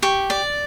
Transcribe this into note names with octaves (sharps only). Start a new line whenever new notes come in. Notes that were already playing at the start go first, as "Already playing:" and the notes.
G4 C#6
D5